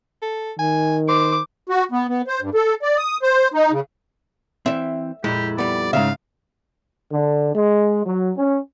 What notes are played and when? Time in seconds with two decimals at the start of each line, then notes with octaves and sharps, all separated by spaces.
0.22 A4
0.59 D#3 G#5
1.09 C5 D6
1.69 F#4
1.92 B3
2.09 B3
2.27 C5
2.41 G2
2.55 A4
2.82 D5
2.98 D#6
3.23 C5
3.54 D#4
3.72 C#3
4.66 E3 C4 E5
5.24 F2 A#2 G#3 E4 G4
5.58 G3 B3 D5
5.93 G#2 C#3 E5 F5
7.12 D3
7.54 G#3
8.06 F#3
8.37 C#4